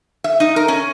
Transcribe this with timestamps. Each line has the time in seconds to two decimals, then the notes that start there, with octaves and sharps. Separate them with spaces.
0.24 E5
0.40 D#4
0.56 A#4
0.68 C#4